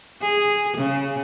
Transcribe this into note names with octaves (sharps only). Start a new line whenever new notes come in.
G#4
C#3